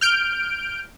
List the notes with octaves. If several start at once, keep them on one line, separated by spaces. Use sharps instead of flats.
F6 G6 D7